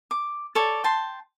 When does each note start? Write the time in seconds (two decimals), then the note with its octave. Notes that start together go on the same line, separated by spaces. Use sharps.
0.11 D6
0.55 A4 C#5 D5
0.84 G5 A5 C6